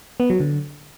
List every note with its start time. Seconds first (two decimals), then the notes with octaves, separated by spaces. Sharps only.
0.20 B3
0.30 F#3
0.40 D3